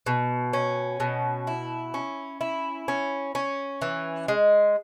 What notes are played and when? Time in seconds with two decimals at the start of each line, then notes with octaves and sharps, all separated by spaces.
0.06 B2
0.53 C#4
1.00 B2
1.47 E4
1.94 C#4
2.41 E4
2.88 C#4
3.35 C#4
3.82 E3
4.28 G#3